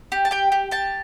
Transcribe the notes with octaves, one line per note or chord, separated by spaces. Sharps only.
G4
A5
G4 G5
G4
G4 A5